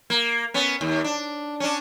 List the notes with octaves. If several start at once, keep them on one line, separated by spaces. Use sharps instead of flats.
A#3
B3 C#4
D#2
D4
C#4 D4